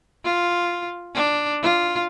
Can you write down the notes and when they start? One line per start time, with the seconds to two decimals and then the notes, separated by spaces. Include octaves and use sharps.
0.24 F4
1.14 D4
1.62 F4